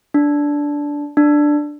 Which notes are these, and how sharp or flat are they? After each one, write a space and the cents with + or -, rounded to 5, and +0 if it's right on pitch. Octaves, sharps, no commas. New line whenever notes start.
D4 -10
D4 +5